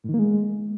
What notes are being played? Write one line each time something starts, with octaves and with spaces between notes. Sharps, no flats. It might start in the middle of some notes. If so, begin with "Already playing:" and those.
A2
D#3
A#3
G#3